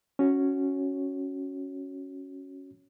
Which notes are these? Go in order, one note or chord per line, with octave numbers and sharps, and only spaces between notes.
C#4 F#4 C#5